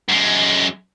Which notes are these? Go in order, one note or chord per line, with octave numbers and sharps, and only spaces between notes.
F#2 G#3